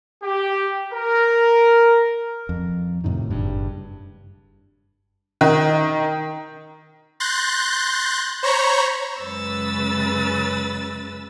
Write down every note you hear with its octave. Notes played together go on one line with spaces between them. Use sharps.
G4
A#4
F2
F2 A2 C3 D#3
F#1 G2
D#3
C6 F#6 G6 A6 A#6
C5 C#5 A#5 B5 C#6
F#2 C#3 G#3 B4 E6 A6